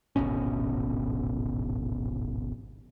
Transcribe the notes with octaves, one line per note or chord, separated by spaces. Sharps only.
D1 G#1 B2 C#4